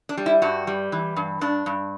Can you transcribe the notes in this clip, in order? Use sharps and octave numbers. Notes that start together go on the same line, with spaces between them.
D4
G3
E4
G2 F#4
G3
E3
G2
G2 D4
G2